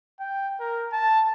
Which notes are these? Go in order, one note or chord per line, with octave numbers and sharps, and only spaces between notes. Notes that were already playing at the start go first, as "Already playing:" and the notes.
G5
A#4
A5